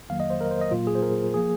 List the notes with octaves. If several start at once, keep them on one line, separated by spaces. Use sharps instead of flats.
F2 D#3 F#3 A#3 F5
D#5
C5
A#4
C5
D#5
A#2 F#3 A#3 F4
G#4
C5
A#4
F3 A#3 G#4